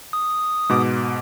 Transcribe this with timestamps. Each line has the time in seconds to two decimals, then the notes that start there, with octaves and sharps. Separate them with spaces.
0.13 D#6
0.69 G#2 B2 D6